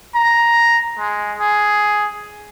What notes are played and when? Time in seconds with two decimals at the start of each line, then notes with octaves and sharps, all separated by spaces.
0.15 A#5
0.98 G#3
1.39 G#4